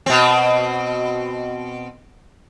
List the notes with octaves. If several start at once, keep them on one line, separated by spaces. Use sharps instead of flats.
B2 C4